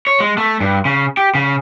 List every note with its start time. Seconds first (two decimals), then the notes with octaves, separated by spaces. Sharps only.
0.07 C#5
0.20 G#3
0.38 A3
0.60 G2
0.85 C#3
1.17 G4
1.35 C#3